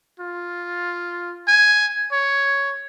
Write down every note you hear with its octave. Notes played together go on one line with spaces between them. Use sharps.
F4
G#5
C#5